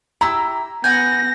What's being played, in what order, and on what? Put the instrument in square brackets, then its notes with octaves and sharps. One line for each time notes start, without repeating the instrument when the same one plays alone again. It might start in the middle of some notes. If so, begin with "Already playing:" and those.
[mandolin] E4 G4 E6 [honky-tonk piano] A#5
[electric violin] B3 A#6 [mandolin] F#5 G#5 [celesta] G6